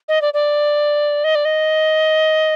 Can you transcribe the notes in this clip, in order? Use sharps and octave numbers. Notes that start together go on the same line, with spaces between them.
D#5
D5
D5
D#5
D5
D#5